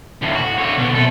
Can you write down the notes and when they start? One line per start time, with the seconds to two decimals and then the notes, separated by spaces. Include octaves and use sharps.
0.22 D2 A2
0.35 F#4
0.59 D3 C#5
0.78 B2
0.94 C3 A4